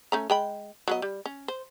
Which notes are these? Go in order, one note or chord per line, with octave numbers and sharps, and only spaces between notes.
A3 C#4 A#5
G#3 G5 B5
F#3 B3 D#5
G3
C#4
C5